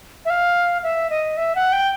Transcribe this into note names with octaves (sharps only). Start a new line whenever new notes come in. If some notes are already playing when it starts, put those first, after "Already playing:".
E5
F5
E5
D#5
E5
F#5
G5